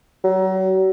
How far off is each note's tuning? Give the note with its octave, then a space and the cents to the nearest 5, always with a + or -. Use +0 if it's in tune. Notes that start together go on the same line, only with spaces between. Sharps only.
F#3 +35